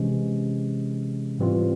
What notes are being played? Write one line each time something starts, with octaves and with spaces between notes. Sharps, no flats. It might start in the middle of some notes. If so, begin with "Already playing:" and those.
Already playing: C3 E3 G#3 C#4
G#2 E3 G3 C4 F4